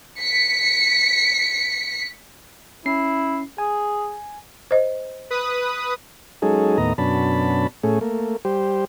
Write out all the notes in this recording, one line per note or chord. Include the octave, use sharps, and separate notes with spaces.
B6 C#7
C#4 E4 C7
G#4 G#5
C5 D#5
B4 D#6
F#3 G#3 C#4 D#4 G#4 A4
D#2 A2 B3 D#5 A#5
F#2 B2 C#4 D4 A5 B5
A2 A3 C#4 G#4
A3 A#3
G3 G4 C5